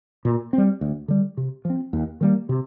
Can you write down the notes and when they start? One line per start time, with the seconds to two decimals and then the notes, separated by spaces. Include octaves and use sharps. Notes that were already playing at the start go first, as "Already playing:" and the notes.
0.25 A#2
0.53 G3 C4
0.81 D2
1.08 D3 G3
1.37 C3
1.65 F3 C4
1.93 D#2
2.21 D#3 G3 A#3
2.49 C3